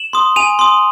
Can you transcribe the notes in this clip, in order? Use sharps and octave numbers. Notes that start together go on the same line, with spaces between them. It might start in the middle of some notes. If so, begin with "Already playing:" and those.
Already playing: E7 F#7
C6 D#6
G#5 D#7 F7
C6 D#6